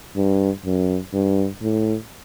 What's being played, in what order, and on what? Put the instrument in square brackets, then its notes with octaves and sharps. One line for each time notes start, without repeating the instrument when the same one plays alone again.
[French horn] G2
F#2
G2
A2